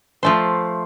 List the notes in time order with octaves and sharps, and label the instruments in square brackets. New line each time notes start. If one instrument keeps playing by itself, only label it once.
[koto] F3 A3 C5